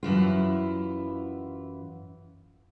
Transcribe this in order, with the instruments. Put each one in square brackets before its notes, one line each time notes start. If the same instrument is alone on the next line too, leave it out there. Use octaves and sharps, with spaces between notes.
[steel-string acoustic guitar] F#2 E3 E4 F4